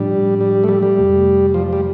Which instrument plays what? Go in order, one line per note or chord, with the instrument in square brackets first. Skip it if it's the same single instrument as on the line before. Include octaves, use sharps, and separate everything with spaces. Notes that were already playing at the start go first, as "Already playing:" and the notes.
Already playing: [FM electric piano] A2 F3 D4 [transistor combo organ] G3
[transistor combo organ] G3
A3
G3
G3
[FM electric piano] F2 C3 A3
[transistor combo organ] F3
G3